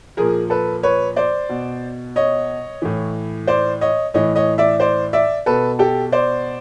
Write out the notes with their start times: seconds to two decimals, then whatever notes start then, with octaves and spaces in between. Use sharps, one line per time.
0.17 A#2 F3 G#4 A#4
0.50 A4 B4
0.83 B4 C#5
1.16 C5 D5
1.49 B2
2.16 C#5 D#5
2.82 A2 E3
3.47 C5 D5
3.81 C#5 D#5
4.14 A2 E3 C#5 D#5
4.36 C#5 D#5
4.58 D5 E5
4.80 C5 D5
5.13 D5 E5
5.46 B2 A4 B4
5.79 G4 A4
6.12 C5 D5